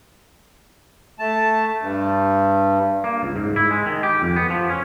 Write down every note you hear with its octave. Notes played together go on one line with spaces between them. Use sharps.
A3 A5
G2
A#3
C#2
G#2
E4
G#3
D#3
G4
F2
B3
F3
C#4